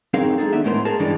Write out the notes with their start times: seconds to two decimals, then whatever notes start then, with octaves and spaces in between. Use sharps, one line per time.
0.14 F#2 C4 D#4 G#4 A#4 F5
0.38 G#3 D#4 G#4 A4
0.53 D#2 B3 D4 E5
0.64 A2 G#3 B3 A#4 C5 C6
0.85 G#4 A#4 A5
0.99 G2 D3 E3 G#3 D4